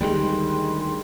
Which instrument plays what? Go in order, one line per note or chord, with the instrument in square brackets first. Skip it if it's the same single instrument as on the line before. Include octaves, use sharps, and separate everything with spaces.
[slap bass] D2 D#3 [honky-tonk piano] G3 G#3 [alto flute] C6